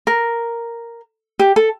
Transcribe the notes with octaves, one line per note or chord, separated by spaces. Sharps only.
A#4
G4
A4